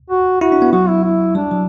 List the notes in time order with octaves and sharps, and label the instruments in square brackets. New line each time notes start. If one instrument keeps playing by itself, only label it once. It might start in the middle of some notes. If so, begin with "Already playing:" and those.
[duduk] F#4
[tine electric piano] E4 [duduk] F#4
[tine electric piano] D4
B3
[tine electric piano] F#3 [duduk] F#4
[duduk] E4
E4
[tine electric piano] G3 [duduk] D4
[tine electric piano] F#3